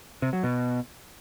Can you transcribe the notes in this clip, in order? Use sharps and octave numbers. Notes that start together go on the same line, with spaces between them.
C3
F#3
B2